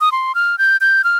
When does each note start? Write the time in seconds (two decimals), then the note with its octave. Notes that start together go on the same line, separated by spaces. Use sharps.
0.01 D#6
0.12 C6
0.35 F6
0.58 G6
0.81 G6
1.04 F6